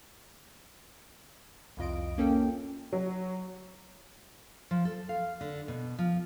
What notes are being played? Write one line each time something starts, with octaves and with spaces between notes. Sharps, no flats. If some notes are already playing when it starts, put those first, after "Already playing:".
C2 F2 F4 D#5 D7
A#3 C#4 A4 G5
F#3
F3
A4
F5
D3
B2
F3